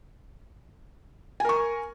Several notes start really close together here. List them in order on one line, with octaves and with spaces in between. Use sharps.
G#5 A#4 C#6